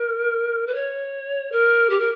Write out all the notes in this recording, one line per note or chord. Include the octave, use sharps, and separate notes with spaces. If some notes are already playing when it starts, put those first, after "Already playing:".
Already playing: A#4
B4
C#5
A#4
G4
A#4